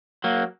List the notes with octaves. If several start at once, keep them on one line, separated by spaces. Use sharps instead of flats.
F#3 A#3